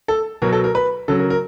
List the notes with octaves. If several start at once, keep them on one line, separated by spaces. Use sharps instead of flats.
A4
B2 F#3 A#4
A4
A#4
B4
C#3 F#3 A4
A#4
A#4